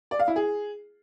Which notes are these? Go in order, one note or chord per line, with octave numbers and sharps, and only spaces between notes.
D5
F5
E4
G#4